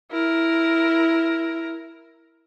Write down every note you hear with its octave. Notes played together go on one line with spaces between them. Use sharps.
E4 A#4